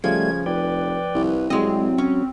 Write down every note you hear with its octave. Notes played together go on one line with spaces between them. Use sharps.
C#3 F3 G3 A3 G#6
F1 B4 D5 G5
C2
C2 F#3 G#3 C4 D#5
C#4